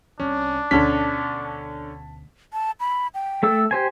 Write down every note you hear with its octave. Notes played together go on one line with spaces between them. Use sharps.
C2 C3 C#4 D4
D2 B2 D3 C#4 A5 B6
A5
B5
G5
A3 A4 E6
G4 C5 G#5